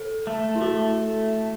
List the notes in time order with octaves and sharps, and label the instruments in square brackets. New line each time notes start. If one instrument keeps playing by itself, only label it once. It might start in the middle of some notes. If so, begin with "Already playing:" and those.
Already playing: [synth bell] A4
[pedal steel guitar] A3
[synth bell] E4
[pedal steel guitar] A3 [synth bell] F#4